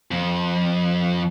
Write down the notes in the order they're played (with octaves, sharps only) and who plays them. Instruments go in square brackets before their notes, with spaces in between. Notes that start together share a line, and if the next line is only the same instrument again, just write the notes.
[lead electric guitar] F2